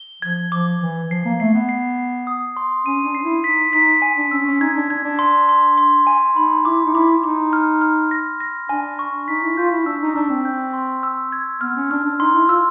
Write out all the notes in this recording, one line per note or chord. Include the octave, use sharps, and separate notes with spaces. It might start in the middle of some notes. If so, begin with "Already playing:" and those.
Already playing: G7
F3 G#6
F3 D6
E3 D6
F3 C7
A#3
A3 C7
B3
C7
C7
D#6
C6
C#4 D#7
D4
C7
E4
D#4 B6
D#4 B6
G#5
D4
C#4 E6
C#4
D#4 G#6
D4
D4 G#6
D4
C6
C6
C6
G#5
D#4 B5
E4 D6
D#4
E4 D6
D#4 D6
F6
F6
A#6
A#6
D4 G#5
C#6
D#4 B6
E4
F4 G6
E4
D4 E6
D#4
D4 E6
C4
G6
C6
E6
G#6
B3 F6
C#4
D4 F6
D4
D#4 C6
E4
F4 E6